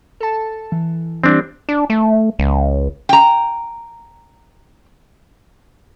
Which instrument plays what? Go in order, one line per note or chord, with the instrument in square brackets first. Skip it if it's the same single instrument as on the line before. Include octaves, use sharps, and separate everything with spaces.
[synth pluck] A4 A5
E3
[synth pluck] E3 G3 G4 [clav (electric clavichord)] C4 D4
[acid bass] D4
A3
C#2
[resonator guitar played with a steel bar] G5 A#5